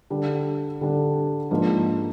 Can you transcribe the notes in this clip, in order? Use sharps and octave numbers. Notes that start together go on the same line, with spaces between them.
D3 G3 D4
D3 G3 D4
G#2 F3 A#3 D4